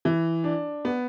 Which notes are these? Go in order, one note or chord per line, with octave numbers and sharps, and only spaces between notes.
E3
D4
B3